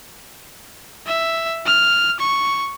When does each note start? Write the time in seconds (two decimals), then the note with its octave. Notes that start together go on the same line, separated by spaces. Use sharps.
1.07 E5
1.66 F6
2.20 C#6